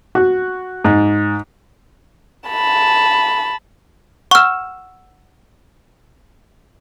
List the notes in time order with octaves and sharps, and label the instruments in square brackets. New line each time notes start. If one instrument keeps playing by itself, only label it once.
[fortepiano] F#4
G#2
[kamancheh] A5 B5
[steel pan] F#5 E6 [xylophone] C#6 F6